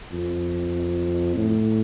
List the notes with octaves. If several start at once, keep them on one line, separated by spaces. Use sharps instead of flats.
F2
A2